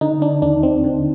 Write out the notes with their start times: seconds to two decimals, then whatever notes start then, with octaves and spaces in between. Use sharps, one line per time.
0.01 D3 D#4
0.22 D4
0.42 D#2 D4
0.63 C4
0.84 D3